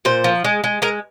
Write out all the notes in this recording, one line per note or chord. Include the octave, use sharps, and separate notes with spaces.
A#2 C5
F3
G#3
G#3
G#3 A#4